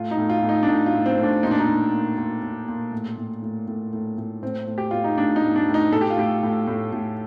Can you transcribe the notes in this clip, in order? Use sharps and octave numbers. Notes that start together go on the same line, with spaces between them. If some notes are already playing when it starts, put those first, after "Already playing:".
Already playing: A2 F4
D#4
A2
F4
A2
D#4
D4
A2 D#4
F4
A2
C4
A2
D4
A#2 D#4
D4
D#4
A#2
A#2
A#2
A#2
A#2
A2
A2
A2
A2
A2
A2
A2 C4
A2
G4
A2 F4
D#4
A2 D4
D#4
A2
D4
A2
D#4
A2 A4
G4
F4
A2 G4
A2
A2
A2